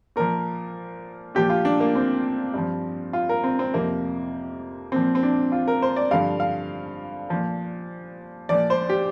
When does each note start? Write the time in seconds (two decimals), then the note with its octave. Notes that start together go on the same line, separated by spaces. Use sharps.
0.16 A#2 F3 A#4
1.35 A#2 F3 G4
1.50 F4
1.65 D4
1.80 A#3
1.95 C4
2.54 G2 F3
3.13 F4
3.29 A#4
3.44 C4
3.59 C4
3.74 F2 C3 F3 A#3
4.92 A#2 F3 C4
5.15 C4
5.23 D4
5.52 F4
5.68 A#4
5.82 C5
5.96 D5
6.11 G2 D3 F3 F5
6.40 F5
7.30 A#2 F3
8.49 A#2 F3 D5
8.70 C5
8.90 G4